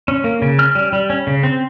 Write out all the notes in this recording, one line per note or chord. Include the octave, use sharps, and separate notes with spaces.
C#4
A#3
C#3
C#4 F6
G3
G3
C#4
C#3
C4